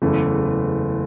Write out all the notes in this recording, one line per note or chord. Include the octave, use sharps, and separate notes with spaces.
F#1 E2 C#3 E3 A3